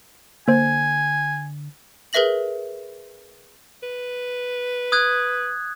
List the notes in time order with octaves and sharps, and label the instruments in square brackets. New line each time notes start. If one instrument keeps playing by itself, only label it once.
[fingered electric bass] D3 [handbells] A#3 C5 [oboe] G#5
[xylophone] G#4 A#4 B4 E5 A#6 F#7
[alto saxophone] B4
[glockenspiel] D#6 F#6 G#6